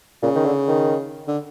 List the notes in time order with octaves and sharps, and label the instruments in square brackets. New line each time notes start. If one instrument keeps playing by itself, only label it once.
[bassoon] A#2 [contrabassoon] C#3
[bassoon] D#3
D3
D#3
[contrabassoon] D3